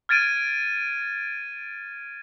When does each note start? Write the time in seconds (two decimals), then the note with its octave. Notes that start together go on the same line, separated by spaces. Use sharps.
0.09 F6 G#6 A6 D7 D#7